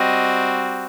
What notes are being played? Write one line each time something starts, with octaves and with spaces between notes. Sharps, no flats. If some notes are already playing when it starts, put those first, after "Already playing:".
Already playing: G3 C4 F#4 D#5